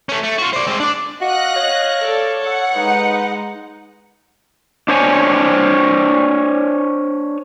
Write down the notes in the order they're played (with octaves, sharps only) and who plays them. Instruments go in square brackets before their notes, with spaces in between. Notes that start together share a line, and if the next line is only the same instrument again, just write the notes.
[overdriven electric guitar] A3 C#4
A3
F4 F#4
C5 D5
G#3 C4
D4 D5
[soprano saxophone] F#4 [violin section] D#5 F#6 A#6 [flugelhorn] F5
[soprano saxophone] C#5
[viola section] A4 [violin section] D5
[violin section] F#5
[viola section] G#3 D#4 [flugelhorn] B4
[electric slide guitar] D4 C5 C#5 G#5